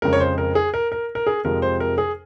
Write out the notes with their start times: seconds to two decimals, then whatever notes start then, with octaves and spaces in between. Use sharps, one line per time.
0.02 F2 C#3 G#3 A#4
0.13 C#5
0.20 C5
0.38 A#4
0.55 G#4
0.74 A#4
0.92 A#4
1.15 A#4
1.27 G#4
1.45 F2 C3 F3 G#3 A#4
1.62 C5
1.80 A#4
1.98 G#4